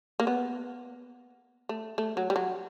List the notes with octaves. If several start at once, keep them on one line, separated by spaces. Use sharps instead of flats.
A#3
B3
A3
A3
F#3
G3
F#3